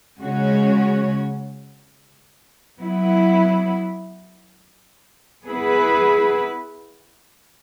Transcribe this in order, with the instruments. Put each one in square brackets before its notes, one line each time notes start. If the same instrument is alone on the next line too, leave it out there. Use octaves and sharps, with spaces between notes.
[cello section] C#3 G#3 C#4 F#4 C#5
F#3 B3 E4
B3 E4 G#4 B4